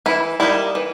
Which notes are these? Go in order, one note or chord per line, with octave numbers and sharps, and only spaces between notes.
E3 E4
G3 A#3 D#4 E4
E3